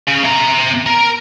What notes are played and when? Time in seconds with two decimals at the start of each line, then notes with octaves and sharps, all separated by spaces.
0.07 C#3
0.24 C3 A#5
0.86 A#4